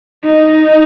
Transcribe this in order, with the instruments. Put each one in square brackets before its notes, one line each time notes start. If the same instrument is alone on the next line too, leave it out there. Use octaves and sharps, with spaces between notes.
[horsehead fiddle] D#4